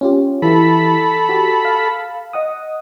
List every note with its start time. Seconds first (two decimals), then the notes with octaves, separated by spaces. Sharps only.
0.01 C#4 F4 G4
0.42 E3 E4 G4 A4 B5
1.29 F#4 G4
1.65 F5
2.33 D#5 F#5 D#6